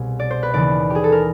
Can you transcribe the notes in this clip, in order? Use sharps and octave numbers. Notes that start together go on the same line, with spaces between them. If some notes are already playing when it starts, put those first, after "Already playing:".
Already playing: C2 B2 G#4
D5
C5
B4
D#2 C#3 E3 D5
G4 G#4
A4
A#4